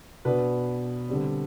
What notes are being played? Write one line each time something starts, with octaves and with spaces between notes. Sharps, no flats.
B2 B3 D4 B4
D3 G3 C4